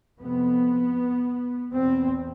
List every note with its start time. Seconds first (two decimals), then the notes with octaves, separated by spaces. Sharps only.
0.19 F2 C3 B3
1.72 E2 B2 C4